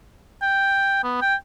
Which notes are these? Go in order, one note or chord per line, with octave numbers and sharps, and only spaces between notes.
G5
B3
G5